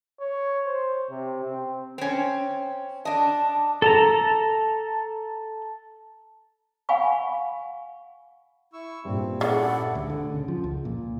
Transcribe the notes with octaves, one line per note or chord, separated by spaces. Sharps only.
C#5
C5
C3
C4
C4 C#4
D4 D#5 A5
A4 A5 A#5
F5 F#5 G#5 B5 C#6
E4 C#6 E6
G2 A#2 C4
C#3 E4 A4 D5 F#5
D2
D3
C#3
F3
C#2
A#2